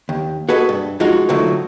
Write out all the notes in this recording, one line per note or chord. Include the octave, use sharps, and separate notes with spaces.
D#2
F#4 G#4 A4 B4 D#5
G2
F3 G#3 D#4 F4 F#4
A2 D3 F3 F#3 A3 D#4